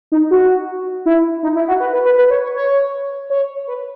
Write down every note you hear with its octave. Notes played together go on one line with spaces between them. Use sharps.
D#4
F#4
E4
D#4
E4
F#4
B4
B4
B4
B4
C#5
C#5
C#5
C#5
B4